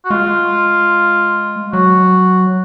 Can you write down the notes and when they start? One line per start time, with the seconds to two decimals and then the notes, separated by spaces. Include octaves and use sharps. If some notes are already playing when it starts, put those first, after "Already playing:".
0.05 F#4
0.10 G#3 F4
1.72 F#3 F#4